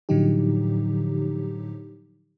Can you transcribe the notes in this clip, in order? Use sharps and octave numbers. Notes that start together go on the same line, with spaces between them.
A2 D3 F3 F#3 D#4 G4